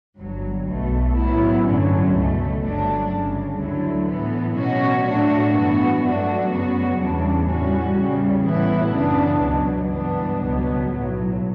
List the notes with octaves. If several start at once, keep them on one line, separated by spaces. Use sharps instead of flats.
G1 G2 F#3
B1 B2 A3
A2 F#3 B3 E4
G2 D3 F#3 C#4
C#2 B2 A3
G1 G2 F#3 A3 D4
G1 F#2 C#3 G3
D2 D3 F#3 A3 E4
A2 E3 B3
B2 F#3 C#4 F#4
A2 F#3 A3 D4 F#4
G2 E3 B3 F#4
G2 F#3 A3 D4 F#4
F#2 C#3 F#3 B3 F#4
E2 C#3 E3 G3 D4
A2 G3 C#4 F#4
E2 C#3 G3
A1 A2 E3 B3 E4
F#2 C#3 E3 B3 D4
C#2 B2 F#3
G2 E3 B3 D4
C#2 B2 F#3 B3
B1 A2 F#3